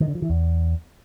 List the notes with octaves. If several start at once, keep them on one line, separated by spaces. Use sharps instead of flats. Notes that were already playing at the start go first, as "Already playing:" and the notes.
D#3
D3
F3
E3
E2